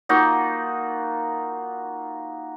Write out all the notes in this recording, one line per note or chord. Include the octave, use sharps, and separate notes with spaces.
A#3 D#4 F4 F#4